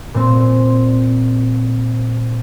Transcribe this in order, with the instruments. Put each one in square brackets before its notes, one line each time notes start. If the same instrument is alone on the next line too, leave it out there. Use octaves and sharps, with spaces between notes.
[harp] A#2 C4